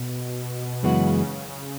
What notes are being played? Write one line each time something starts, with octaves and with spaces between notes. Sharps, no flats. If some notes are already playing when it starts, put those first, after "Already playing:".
Already playing: B2
F#2 C#3 E3 G#3 B3 F#4